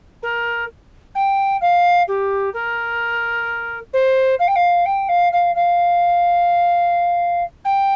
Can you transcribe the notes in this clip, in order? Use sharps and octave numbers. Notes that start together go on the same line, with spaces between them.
A#4
G5
F5
G4
A#4
C5
F5
G5
F5
G5
F5
F5
F5
G5